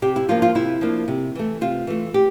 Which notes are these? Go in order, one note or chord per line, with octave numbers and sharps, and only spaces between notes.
C3 G4
E4
F3 A#3 D4 F4
F4
C3 E4
F3 A#3 D4
C3
E3 A3
C3 F4
E3 A3
G4